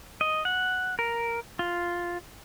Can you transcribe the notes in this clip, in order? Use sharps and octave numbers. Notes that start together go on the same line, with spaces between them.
D#5
F#5
A#4
F4